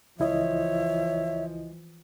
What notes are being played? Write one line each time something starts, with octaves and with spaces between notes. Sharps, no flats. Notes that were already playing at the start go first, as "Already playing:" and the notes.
C#2 E3 F3 E4 C#5 D#5 E5